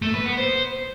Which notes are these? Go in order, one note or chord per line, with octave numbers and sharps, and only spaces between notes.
A3
B4
B3
C5